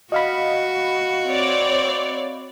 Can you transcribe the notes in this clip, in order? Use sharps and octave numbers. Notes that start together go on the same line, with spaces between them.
F#4 D#5 F5 B5
C4 C#5 D5